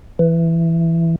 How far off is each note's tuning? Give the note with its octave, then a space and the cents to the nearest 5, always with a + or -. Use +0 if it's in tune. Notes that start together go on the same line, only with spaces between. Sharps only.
E3 +10